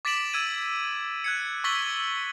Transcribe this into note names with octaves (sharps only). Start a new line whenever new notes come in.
D6 A6 B6 D7 E7 F#7
E6 G#6 D#7
F#6 G#6 C#7
C#6 E6 A6 B6 F#7 G7